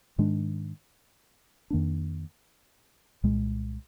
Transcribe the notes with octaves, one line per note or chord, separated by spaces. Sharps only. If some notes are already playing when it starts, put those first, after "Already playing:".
G#2 D#3 G#3 D4
F2 D#3 A#3 D4
C2 A#2 G#3